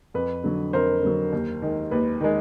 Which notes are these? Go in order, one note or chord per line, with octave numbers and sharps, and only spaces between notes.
F2 B4
D3 F#3
F2 A#4 C5
D3 F#3
D#2
D#3 G#3
D#2 B4
D#3 G#3